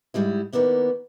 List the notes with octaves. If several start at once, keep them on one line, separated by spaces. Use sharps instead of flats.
G#2 G3 G#3 E4
D#3 A#3 B3 D4 E4